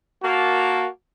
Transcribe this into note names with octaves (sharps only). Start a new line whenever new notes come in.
A#3 F#4 A5